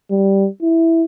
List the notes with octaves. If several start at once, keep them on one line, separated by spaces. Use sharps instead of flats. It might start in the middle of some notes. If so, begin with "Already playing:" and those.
G3
E4